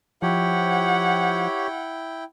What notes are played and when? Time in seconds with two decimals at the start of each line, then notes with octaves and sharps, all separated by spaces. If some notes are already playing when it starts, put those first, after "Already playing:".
0.22 F3 E4 G4 C#5 F#5 G5